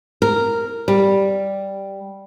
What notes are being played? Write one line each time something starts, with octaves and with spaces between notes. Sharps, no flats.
A#4
G3